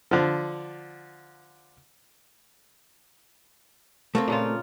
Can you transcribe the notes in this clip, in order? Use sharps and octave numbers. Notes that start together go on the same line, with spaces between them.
D3 F3
A3 A#3 C4
A#2 C#3 F4